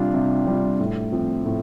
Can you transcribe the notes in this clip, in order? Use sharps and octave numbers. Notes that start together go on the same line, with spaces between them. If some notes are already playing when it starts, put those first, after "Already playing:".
Already playing: C3 G3 D4 F4
C3
G3 D4 F4
A2
F3 C4
A2